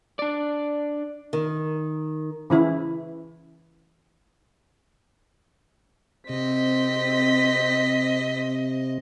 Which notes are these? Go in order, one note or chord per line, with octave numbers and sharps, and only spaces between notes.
D4 D5
D#3
C#3 E3 E4
C3 C4 D#5 B6